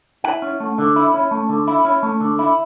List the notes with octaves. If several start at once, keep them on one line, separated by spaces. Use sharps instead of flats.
E4 F#5
C#4
A3
D3
E4
C#4
A3
D3
E4
C#4
A3
D3
E4